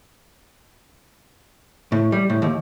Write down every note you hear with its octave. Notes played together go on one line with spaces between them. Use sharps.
A2
G3
A2
D#2